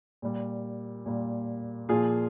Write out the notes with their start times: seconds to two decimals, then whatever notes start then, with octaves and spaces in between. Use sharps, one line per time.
0.22 A#2 G3
1.06 A#2 G3
1.89 A#2 F3 F4 G#4